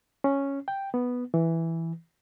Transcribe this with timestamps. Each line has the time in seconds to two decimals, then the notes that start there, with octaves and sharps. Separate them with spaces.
0.24 C#4
0.68 G5
0.94 B3
1.34 E3